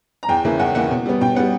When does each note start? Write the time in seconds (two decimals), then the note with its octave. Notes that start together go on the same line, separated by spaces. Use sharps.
0.23 A#5
0.29 E2 G5
0.44 C#3 E3 A#3 C#4
0.60 E2 F#5
0.75 C#3 E3 A#3 C#4 F#5
0.91 B2
1.06 G3 B3
1.21 B2 G5
1.36 B3 F#5
1.39 G3